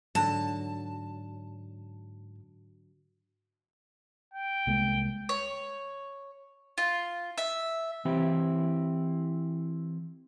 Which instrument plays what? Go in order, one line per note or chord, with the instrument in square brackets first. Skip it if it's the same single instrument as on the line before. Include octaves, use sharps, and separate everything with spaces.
[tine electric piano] G#2 [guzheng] D3 F#3 [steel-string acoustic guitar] A5
[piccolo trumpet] G5
[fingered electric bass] C2 G#3 A#3
[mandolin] C#5
F4
E5
[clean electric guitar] E3 C4 E4 G4